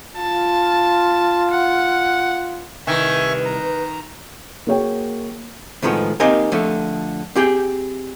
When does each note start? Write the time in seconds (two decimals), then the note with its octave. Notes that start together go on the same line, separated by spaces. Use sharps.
0.17 F4 A5
1.51 F#5
2.87 C2 D#3 B4 E5 G#5 C#6
3.45 A#5
4.67 A#3 F#4 G#4 C#5 G5
5.82 A2 D#3 F3 G#3 B3
6.20 A#3 C4 D#4 G4 A#4 G#5
6.52 D3 F3 A3
7.35 C4 G4 G#4 G5